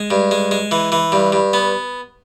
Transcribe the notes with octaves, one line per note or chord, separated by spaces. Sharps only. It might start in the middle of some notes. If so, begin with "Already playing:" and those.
Already playing: G#3
G2
G#3
G#3
E3
E3
G2
G2
B3